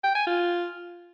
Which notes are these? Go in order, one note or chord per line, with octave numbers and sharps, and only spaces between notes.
G5
G#5
F4